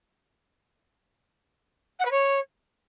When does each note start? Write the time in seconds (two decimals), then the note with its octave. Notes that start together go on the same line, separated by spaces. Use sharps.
2.00 F#5
2.05 B4
2.11 C#5